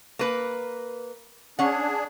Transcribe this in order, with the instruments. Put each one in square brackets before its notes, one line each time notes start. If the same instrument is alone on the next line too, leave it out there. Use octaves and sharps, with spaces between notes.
[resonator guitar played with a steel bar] A#3 B4
[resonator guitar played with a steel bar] C#4 F#5 [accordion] D4 G#4